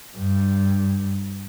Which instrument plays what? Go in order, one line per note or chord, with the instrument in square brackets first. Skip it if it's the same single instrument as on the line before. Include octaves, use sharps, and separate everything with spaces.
[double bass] G2